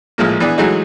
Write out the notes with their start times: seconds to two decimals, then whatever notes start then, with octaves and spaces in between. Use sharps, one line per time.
0.18 A1 A#2 F3 G#3 A#3
0.40 E3 B3 D4 G#4
0.58 E3 F#3 G#3 A3 D#4 F#4